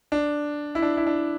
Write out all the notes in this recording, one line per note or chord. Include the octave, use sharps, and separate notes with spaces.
D4
E4
D4
E4
D4